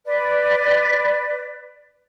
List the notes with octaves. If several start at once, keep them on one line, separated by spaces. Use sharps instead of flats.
B4 D5